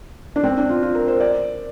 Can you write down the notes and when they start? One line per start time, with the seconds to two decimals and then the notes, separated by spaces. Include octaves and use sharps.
0.36 D4
0.44 C4
0.57 D4
0.69 F4
0.83 F4
0.95 A#4
1.08 C5
1.20 D5